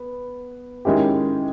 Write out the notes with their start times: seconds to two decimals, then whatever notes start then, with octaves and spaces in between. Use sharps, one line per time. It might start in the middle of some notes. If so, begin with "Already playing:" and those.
Already playing: B3
0.85 D#3 G#3 C#4 E4 G4